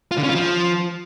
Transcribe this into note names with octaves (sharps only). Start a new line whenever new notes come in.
F4
D3
C#4
F4
F3